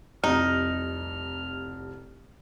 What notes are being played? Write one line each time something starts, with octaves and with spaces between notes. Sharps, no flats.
F1 C2 F2 D#4 F6